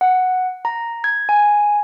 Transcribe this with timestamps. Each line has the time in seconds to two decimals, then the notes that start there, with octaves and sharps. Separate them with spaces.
0.01 F#5
0.65 A#5
1.04 G#6
1.29 G#5